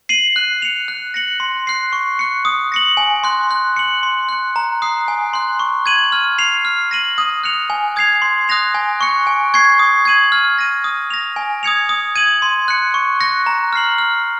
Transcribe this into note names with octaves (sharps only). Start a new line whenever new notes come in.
C7 D#7 F#7
F#6
C#7 F7
F#6
A#6 C#7 F#7
C6
F#6 C7
C#6
F#6 C#7
D#6
A#6 C#7 F#7
G#5
C6 F#6
F#6
C#7 F#7
C6
F#6 C#7
A#5
D#6 F#6 C7
G#5
C6 F#6
C#6
G#6 D#7 F#7
F6
C7 F7
F6
A#6 D#7 F#7
D#6
F#6 C#7 F7
G#5
D#6 G#6 C7 F7
C6
D#6 F#6 A#6 F7
G#5
C#6 F#6 C#7
G#5
C#6 G#6 C7
D#6
G#6 D#7 F#7
F6
A#6 D#7
D#6
A#6 F7
G#5
D#6 G#6 C#7 F7
D#6
G#6 D#7 F#7
C6
F#6 C#7
C#6
F#6 A#6 C#7
A#5
F6 C7 F#7
F6